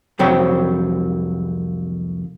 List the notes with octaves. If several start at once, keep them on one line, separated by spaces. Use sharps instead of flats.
C2 F2 F#3 C4 C#5 G5